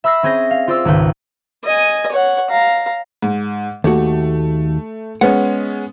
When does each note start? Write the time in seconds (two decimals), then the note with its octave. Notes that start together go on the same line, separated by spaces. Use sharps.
0.04 E5 B5 E6 F#6 A#6 C7
0.23 C4 C#4 G#4 G6 A#6
0.51 F5
0.67 F4 C5 D5 C6 E6
0.85 G#1 C#2 B4 G6
1.64 D#5 G#5
2.12 C#5 F#5
2.50 F5 A#5
3.22 G#2
3.84 D#2 A3 F#4
5.21 G#3 B3 C#4 F#5